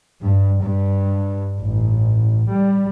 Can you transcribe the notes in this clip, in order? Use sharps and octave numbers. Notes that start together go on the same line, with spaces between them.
G2
G2
A1
G3